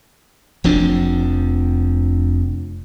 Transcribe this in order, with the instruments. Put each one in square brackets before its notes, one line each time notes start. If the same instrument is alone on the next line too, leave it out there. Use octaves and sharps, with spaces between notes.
[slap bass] F1 C3 F3 D4